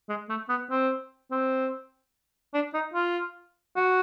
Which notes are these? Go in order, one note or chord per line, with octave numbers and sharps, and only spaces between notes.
G#3
A3
B3
C4
C4
D4
D#4
F4
F#4